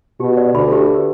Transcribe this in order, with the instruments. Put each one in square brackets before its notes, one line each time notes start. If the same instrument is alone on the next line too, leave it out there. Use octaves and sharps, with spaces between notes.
[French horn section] B2 [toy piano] G4
[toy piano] D5
[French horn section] D2 D3 [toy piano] B5
[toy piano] G4
B4